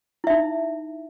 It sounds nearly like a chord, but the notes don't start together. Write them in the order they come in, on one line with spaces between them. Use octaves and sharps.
E4 E5 D#4